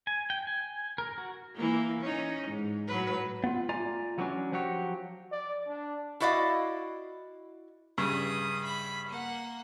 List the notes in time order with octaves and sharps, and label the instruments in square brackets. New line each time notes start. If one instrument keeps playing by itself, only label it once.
[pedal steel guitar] G#5
G5
G#5
A#4
F#4
[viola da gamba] E3 A#3
C#4 D#4
G#2
A2 F#3 B4
[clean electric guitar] B3 F4
A3 F4 D5 G#5 A#5
E3 F#3 G3 A3 C#4 D4
F3 F#3 F#4 G4 C#5
[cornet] D5
D4
[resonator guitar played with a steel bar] E4 F#4 D5 D#5 F5
[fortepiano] G2 C#3 [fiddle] E5 D#6
[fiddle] E5 B5
A#3 F#5